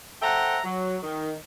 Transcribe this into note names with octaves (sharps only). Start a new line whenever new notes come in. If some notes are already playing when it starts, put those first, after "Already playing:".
A4 C5 E5 F#5 G5 A#5
F#3
D#3